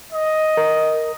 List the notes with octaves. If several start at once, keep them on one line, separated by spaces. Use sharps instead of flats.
D#5
A#4